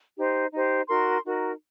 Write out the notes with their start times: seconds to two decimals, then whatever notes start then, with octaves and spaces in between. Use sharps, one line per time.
0.18 D#4 G4 C5
0.52 D#4 G4 C5
0.88 D#4 F#4 A#4 C6
1.24 D#4 F#4 A#4